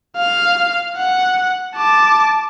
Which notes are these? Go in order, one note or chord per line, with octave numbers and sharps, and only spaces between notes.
F5
F#5
A5 D6